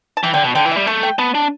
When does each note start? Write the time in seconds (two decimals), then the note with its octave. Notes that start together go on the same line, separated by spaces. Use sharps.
0.17 A5
0.23 E3 G5
0.34 D3 G5
0.44 B2
0.55 D3 G5
0.65 E3
0.71 G3 E5
0.86 A3 A5
1.03 G5
1.18 B3 A5
1.35 D4